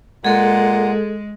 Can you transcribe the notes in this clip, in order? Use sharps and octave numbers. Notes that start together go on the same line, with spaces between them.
A#2 G#3 G#4 A4 F#5